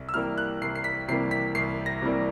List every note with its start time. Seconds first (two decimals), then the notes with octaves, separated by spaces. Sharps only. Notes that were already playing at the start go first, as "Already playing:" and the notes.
Already playing: C2
0.09 E6
0.14 C3 E3 G3 A#3 F6
0.38 F#6
0.61 C2 C7
0.75 C7
0.84 B6
1.08 C3 E3 G3 A#3 C7
1.31 B6
1.55 C2 C7
1.86 A#6
2.02 C3 E3 G3 A#3